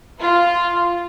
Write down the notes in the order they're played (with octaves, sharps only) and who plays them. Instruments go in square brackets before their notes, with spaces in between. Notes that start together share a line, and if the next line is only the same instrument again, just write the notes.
[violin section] F4